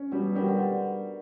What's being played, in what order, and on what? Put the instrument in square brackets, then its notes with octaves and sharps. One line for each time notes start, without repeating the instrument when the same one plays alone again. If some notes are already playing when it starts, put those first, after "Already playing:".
Already playing: [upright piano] C#4
[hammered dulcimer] B2 [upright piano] G3
[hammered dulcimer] D#3 [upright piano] G3
[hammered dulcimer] D3